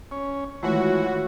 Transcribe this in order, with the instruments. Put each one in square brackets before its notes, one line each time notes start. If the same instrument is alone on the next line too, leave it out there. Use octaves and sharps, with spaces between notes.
[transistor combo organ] C#4
[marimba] D#3 G#3 A3 [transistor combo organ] E3 [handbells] F4 C#5 B5 [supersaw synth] F#4